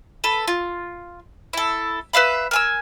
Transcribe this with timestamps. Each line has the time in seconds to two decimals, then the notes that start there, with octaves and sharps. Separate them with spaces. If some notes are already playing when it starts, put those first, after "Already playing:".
0.24 A4 B4
0.48 F4
1.53 E4 A4
2.13 B4 E5 F5 B5
2.51 A#4 G#5 E6